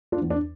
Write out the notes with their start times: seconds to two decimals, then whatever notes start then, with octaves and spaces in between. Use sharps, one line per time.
0.12 D4 F4
0.22 E2 E3
0.30 D4